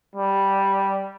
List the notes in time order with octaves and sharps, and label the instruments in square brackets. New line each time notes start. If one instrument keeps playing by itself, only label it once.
[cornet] G3